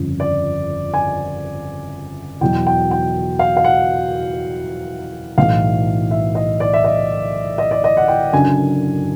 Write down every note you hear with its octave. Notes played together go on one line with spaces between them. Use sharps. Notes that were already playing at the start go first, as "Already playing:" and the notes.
Already playing: G1 F2 C#3
D5
G#5
E2 B2 F#3 G5
G5
G5
F5
F5
F#5
B1 A2 E3 F5
E5
D#5
D5
E5
D#5
D#5
D5
D#5
F#5
G5
F#1 F#2 D3 F#3 G#5